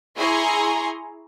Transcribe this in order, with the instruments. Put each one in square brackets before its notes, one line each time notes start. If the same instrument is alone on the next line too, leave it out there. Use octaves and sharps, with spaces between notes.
[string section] E4 G#4 G#5 A#5 C6 C#6